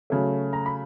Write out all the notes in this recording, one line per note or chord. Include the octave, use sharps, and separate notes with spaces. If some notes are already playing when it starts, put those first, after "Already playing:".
C#3 F#3 A3
A#5
B5